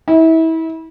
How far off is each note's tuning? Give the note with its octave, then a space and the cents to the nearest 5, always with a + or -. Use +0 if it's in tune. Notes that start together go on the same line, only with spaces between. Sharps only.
E4 -30